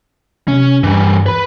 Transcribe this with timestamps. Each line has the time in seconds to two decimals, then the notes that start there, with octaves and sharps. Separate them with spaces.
0.48 C3 C#4
0.83 G2 E3 G3
1.26 B4 B5